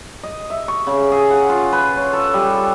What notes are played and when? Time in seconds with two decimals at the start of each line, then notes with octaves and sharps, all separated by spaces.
0.23 D#5
0.50 E5
0.68 C#6
0.87 C#3
1.12 G#4
1.31 F#5
1.49 F4
1.72 B4
1.97 C#5
2.13 A4
2.33 G3